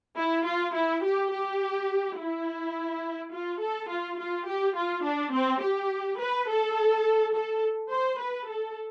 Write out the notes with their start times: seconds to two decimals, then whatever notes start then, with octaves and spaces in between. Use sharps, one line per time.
0.16 E4
0.45 F4
0.74 E4
1.03 G4
1.32 G4
2.17 E4
3.32 F4
3.61 A4
3.89 F4
4.19 F4
4.46 G4
4.75 F4
5.04 D4
5.33 C4
5.61 G4
6.19 B4
6.48 A4
7.34 A4
7.91 C5
8.20 B4
8.48 A4